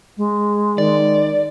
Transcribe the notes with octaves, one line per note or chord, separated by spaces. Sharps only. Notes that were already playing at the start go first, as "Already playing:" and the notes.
G#3
D#3 D5